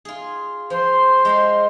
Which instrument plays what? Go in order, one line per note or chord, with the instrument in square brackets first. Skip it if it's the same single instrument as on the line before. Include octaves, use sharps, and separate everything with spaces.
[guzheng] F4 G#4
[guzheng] F3 [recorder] C5
[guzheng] G#3 F5 C6